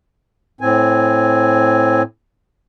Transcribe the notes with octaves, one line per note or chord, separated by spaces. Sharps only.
A2 C4 G#5